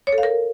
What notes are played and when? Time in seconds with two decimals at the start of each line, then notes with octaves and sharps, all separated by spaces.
0.07 C#5
0.12 A4
0.18 F5
0.23 A#4